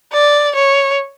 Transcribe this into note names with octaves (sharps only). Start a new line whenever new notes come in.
D5
C#5